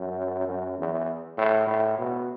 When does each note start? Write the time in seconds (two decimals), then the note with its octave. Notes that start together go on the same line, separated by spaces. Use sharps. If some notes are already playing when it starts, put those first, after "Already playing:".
Already playing: F#2
0.47 F#2
0.78 E2
1.37 A2
1.67 A2
1.98 B2